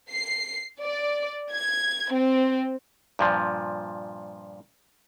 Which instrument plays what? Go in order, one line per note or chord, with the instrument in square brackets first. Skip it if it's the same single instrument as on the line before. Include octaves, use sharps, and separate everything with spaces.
[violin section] C7
D5
G#6
C4
[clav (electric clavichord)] G2 A#2 F3